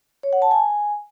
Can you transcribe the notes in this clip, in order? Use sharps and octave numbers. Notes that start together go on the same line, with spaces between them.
C#5
F#5
A5
G#5